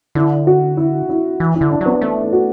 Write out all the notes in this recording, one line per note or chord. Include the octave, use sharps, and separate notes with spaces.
D3 E4
F#4
E4
E4
E3
E4
D3
D4
F#3
B3
A3 B3
E4
F#4